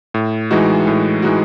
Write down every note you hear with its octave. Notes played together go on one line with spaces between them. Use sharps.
A2
E3 G#3 D#4 F#4
A2
E3 G#3 D#4 F#4